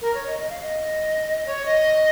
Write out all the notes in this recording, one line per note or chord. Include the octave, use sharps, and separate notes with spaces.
A#4
C#5
D#5
D#5
F5
D#5
C#5
D#5